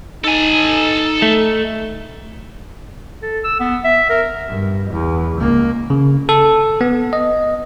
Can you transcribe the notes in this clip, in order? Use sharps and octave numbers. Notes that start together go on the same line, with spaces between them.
D#4 A4 G#5
A3
A4
E6
B3
E5
A#4
G2
E2
C#2 A#3
C#3
A4
B3
D#5